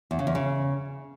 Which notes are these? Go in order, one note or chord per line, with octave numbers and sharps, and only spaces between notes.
E2
C#3
E2
C#3